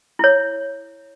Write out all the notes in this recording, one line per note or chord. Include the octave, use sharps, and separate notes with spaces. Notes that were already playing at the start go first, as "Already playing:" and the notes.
E4 C#5